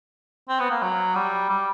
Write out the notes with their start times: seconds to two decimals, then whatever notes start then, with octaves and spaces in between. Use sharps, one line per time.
0.49 C4
0.60 B3
0.71 A#3
0.82 F#3
1.15 G3
1.49 G3